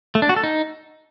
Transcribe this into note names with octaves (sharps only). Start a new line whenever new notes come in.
A3
D4
F#4
A4
D#4